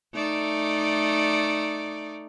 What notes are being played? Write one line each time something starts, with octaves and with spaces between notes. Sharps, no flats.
A3 D#4 D5